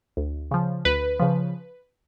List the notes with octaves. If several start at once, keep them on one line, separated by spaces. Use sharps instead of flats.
D2
C#3 F3
D2 B4
C#3 F3